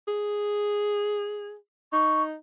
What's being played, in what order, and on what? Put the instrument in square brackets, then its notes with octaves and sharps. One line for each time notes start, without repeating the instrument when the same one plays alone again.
[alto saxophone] G#4
[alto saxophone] D#4 [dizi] C#6